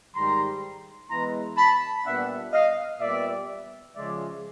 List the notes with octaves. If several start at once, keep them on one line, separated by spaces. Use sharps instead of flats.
G#2 D#3 G3 A#5 C6
E3 G#3 B3 E4 A#5 C6
A5 B5
A#2 G3 B3 D4 E5 F#5
D#5 F5
A#2 G3 B3 D5 E5
C#3 F3 G#3 C#4 D5 E5